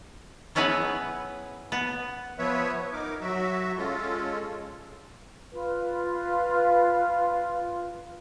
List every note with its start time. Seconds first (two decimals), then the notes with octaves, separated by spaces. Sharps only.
0.55 F#3 B3 C#4 E4 G#4 B4
1.72 B3
2.39 F3 B3 B4 C#5 E5
2.93 D#4 A#4 D6
3.21 F#3 F#4 E5
3.77 G#3 C#4 F4 A4
5.53 F4 B4